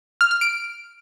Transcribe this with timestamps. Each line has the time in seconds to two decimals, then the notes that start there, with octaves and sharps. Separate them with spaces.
0.21 F6
0.31 F6
0.41 D7